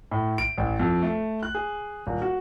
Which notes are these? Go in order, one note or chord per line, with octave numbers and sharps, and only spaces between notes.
A2
D7
A1
F2
A3
F#6
G#4
D#1
F#4